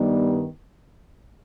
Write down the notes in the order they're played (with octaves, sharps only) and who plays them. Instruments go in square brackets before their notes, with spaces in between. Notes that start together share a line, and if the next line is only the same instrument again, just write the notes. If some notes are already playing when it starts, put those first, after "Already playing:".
Already playing: [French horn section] G2 D#3 G3 B3 D#4